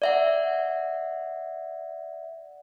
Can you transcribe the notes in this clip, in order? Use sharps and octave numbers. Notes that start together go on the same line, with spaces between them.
D5 E5 F#5